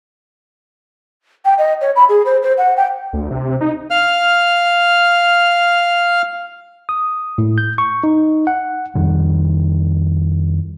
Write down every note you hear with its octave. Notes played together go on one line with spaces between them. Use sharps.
G5
D#5
C#5
B5
G#4
C5
C5
F#5
G5
D2
C3
D#4
F5 F6
D#6
A2
G6
C#6
D#4
F#5
F2 D#3 G3